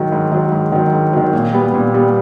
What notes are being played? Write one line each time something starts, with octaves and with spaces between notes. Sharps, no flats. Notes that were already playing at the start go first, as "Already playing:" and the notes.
Already playing: G#2 D#3 F#3
G#2
D#3 F#3
G#2
D#3 F#3
G#2
D#3 F#3
A#2
G3 B3
A#2
G3 B3